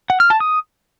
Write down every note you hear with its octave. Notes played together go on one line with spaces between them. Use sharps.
F#5
F6
A5
D#6